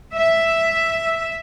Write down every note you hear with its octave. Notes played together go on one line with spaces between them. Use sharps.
E5